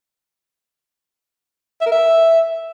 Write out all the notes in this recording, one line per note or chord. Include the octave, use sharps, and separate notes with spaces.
E5
A#4
E5